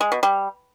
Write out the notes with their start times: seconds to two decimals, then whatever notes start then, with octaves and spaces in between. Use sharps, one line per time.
0.01 G#3
0.12 B2
0.23 G3